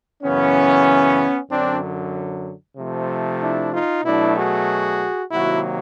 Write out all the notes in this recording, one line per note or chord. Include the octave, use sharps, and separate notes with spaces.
F#2 C#3 E3 B3 C#4
F#2 D3 F#3 C4 D4
C3 F3 A3
D4 E4
D#4 F4
B2 F#3 A3 D4 E4
F#4 G#4
C3 D#3 F#3 A#3 E4 F#4